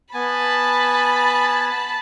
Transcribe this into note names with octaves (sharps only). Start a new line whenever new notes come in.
B3 G#5 A5 B5